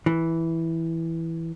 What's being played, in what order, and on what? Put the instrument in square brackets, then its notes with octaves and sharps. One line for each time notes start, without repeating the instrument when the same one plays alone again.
[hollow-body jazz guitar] E3